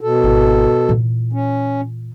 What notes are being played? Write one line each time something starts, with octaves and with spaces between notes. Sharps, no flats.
B2 A4
G#1 E4
A#2 E3
C#4